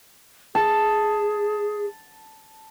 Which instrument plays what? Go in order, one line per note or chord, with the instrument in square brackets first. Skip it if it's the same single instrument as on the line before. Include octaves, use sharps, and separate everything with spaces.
[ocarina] G#4 [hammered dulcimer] A5